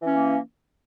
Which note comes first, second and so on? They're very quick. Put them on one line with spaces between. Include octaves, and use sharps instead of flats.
E3 C#4 A#3